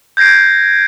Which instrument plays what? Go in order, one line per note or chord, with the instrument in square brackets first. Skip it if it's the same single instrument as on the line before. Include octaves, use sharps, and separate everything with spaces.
[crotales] G6 G#6 A#6 C7 D7